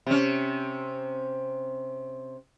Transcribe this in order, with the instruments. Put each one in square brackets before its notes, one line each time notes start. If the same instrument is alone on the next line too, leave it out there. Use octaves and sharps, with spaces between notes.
[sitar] C3 C#4